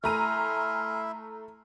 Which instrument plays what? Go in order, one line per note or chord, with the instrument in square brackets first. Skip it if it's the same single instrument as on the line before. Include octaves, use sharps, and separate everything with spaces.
[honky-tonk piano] A3 A#5 D#7 [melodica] E4 E5 [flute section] G#5 C6 F6